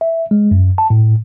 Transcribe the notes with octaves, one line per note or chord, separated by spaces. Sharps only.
E5
G#3
F#2
A5
A2